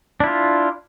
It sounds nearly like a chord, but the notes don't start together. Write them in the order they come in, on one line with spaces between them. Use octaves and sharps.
D4 E4 F4